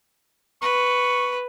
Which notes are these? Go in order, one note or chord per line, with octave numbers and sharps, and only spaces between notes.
B4 C#6